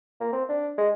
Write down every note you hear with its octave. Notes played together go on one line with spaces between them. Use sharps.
A#3
C4
D4
G#3